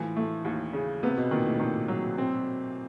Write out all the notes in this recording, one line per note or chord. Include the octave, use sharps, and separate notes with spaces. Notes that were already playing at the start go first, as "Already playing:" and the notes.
Already playing: A2 E3 F3
A3
D#2
C#3
C3 B3
B2
A#2 D#3
A2
A#2 D#3
F#3
C4